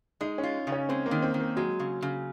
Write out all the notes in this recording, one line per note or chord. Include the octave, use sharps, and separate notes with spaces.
G#3 D#4
C#4
F4
C#3
C#4
G#3 C4
A#3
D#3
C4
D#3
A#3
F#3 G#3
C#3
C#3